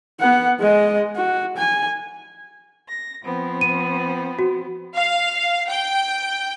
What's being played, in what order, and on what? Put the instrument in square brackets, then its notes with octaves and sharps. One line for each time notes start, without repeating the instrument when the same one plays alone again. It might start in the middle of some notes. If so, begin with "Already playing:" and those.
[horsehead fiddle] B3 F#5
G#3 D#5
F#4
G#5
[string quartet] A#6
F3 B3 C4
[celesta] D#7
F#4
[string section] F5
G5